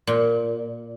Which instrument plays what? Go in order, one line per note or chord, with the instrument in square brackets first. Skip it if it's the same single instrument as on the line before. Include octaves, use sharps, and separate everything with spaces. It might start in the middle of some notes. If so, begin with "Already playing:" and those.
[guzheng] A#2